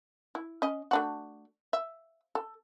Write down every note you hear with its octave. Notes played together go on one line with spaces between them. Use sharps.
E4
C#4 D#5
A3 D4 F#4
E5
A4